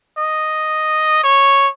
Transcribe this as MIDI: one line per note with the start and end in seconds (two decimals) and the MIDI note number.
0.18 1.22 75
1.23 1.68 73